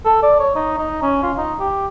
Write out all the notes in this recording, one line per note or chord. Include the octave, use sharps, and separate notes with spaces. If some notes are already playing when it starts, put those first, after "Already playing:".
A4
D5
C#5
D#4
D#4
C#4
F4
D#4
G4